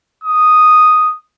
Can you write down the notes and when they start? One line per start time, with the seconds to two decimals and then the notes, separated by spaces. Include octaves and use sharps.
0.24 D#6